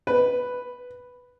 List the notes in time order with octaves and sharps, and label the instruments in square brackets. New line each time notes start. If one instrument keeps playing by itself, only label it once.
[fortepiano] B4